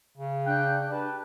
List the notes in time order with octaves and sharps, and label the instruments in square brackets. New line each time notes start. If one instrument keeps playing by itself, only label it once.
[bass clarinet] C#3
[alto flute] D4 [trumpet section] G5 [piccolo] F#6
[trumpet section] G4 B4 A5